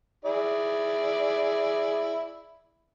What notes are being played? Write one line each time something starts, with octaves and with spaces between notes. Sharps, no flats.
E4 G#4 D5